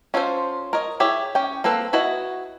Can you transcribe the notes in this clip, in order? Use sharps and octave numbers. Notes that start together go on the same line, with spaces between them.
C#4 F4 A4 A#4 C5
A#4 C#5 D#5
E4 G4 G#4 C#5
C#4 G5
A#3 C4 A4 B4
E4 F#4 B4 D#5